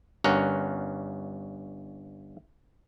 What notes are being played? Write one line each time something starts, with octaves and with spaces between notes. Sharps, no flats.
G1 G2 C#4 A#4 F#5